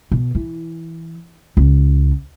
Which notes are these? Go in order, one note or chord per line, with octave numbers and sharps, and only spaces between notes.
B2
E3
C#2